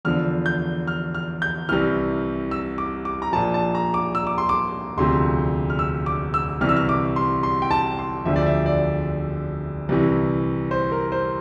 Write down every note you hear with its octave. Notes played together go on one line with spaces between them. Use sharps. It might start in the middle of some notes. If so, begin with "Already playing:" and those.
E2 D3 F3 F6
G6
F6
F6
G6
C2 C3 E3 F6
E6
D6
D6
A#5
A#1 A#2 F3 A5
A5
A#5
D6
E6
D6
C6
D6
E1 D2 C3 F3 C6
F6
E6
D6
E6
C2 C3 E3 F6
E6
F6
D6
C6
C6
G5
A5
C6
E1 D2 D3 F3 E5
D5
E5
D5
C2 C3 E3
C5
A#4
C5